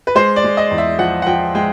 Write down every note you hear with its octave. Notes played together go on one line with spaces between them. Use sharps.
B4
G#3 C5
D5
G#3
D#5
E2
E5
F3 F#5
F#5
F3 G5
G#3 G5